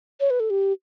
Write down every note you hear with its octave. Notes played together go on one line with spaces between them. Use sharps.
C#5
B4
A4
G4